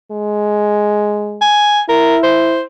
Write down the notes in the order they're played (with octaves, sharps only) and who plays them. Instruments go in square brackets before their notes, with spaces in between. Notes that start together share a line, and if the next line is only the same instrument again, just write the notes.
[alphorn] G#3
[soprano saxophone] G#5
[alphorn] E4 [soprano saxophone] A#4
[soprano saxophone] C5